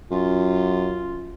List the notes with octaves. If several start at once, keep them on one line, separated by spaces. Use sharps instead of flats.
F#2 F4